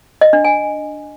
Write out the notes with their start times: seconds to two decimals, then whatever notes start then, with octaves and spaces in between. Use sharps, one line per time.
0.21 D#5
0.33 D4
0.45 G#5